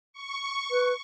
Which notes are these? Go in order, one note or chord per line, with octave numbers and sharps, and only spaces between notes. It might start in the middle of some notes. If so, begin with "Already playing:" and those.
C#6
B4